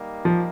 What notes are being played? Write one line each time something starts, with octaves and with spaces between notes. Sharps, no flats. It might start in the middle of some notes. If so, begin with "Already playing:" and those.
Already playing: G3 A#3 D#4
F3